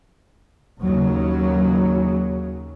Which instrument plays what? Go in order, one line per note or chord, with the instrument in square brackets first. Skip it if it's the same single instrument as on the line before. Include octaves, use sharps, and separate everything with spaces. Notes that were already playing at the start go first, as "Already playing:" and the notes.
[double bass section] D#2 C#3 F#3